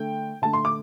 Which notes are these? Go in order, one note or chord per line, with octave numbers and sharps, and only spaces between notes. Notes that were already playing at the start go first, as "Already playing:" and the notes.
Already playing: D3 A3 G5
D3 A3 A5
C6
D6